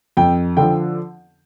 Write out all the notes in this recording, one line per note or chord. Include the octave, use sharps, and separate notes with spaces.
F2 G5
D3 F3 G5